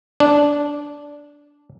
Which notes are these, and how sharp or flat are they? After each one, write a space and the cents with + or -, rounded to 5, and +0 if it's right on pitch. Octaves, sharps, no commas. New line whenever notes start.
D4 -10